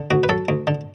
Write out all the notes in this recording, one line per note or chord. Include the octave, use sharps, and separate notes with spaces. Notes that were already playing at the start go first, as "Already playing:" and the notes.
Already playing: D3
D2 F#4
B4
F#3 A4
D2
D3